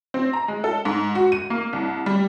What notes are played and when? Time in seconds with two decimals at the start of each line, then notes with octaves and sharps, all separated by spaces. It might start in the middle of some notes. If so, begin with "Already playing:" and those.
0.14 C4
0.33 A#5
0.48 G#3
0.64 A4
0.85 G#2
1.15 F#4
1.32 D#7
1.50 A#3
1.73 C2
2.06 G3